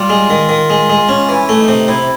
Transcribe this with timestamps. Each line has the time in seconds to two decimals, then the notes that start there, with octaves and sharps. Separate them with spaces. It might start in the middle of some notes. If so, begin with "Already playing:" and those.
Already playing: G3 F4
0.10 G#3
0.30 D#3
0.49 D#3
0.70 G#3
0.89 G#3
1.09 C#4
1.29 E3 E4
1.49 A3
1.59 D#4
1.68 C3
1.88 C3 E4